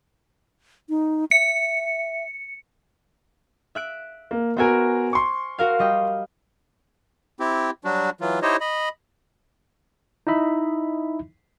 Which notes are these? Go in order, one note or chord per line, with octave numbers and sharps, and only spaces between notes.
D#4
E5 C#7
E5 F#6 D7
A#3
B3 F#4 A#4 C5 E5 G#5
C6 C#6
F#4 A#4 F5
G3 D#5 G5
C4 E4 G4
F#3 G3 D4 F#4
E3 F#3 F4
D#4 E4 G4 C5 C#5 D#5
D#5 B5
D#4 E4 D#5 E5 B5